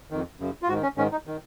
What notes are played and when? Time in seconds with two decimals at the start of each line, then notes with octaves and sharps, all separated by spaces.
0.10 F2 D#3
0.40 F#2 C#3
0.62 F4
0.68 G#2 F#4
0.72 D#3
0.83 C#4
0.97 G#2 D#3 C#4
1.12 D#4
1.27 D#3